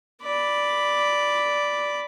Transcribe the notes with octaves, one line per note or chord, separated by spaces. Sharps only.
D5 B5